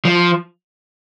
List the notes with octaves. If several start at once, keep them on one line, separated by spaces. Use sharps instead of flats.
F3